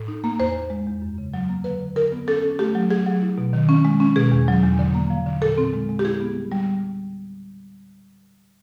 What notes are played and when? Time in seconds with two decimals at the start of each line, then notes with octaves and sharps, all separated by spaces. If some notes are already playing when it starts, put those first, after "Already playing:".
Already playing: A2
0.08 D#4
0.24 A#3
0.39 E2 C5
0.55 E2
0.70 G#3
0.87 E2
1.02 F#2
1.18 C#3
1.34 F#3
1.49 A#3
1.64 D3 B4
1.81 D3
1.96 D3 A#4
2.12 B3
2.27 C#4 A4
2.43 C#4
2.59 A3 G4
2.75 F#3
2.90 F#3 G#4
3.07 F#3
3.22 E4
3.38 B2
3.53 D#3
3.69 C#4
3.85 G#3
4.00 C#4
4.16 B2 G#4
4.32 E2
4.48 F#3
4.63 E2
4.79 D3
4.95 A#3
5.10 F3
5.26 D3
5.42 A#2 A4
5.58 C4
5.73 G#3
5.89 G#3
5.99 G4
6.05 E4 G#4
6.20 B3
6.36 G3
6.52 G3